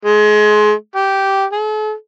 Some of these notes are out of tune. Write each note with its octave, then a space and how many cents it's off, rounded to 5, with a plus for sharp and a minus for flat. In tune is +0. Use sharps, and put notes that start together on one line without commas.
G#3 +25
G4 -10
A4 -45